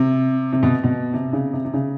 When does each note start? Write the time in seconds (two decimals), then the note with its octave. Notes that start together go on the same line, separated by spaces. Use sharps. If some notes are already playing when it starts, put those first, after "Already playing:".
Already playing: C3
0.53 C3
0.63 B2
0.84 B2
1.14 C3
1.33 C#3
1.53 C3
1.65 C3
1.74 C#3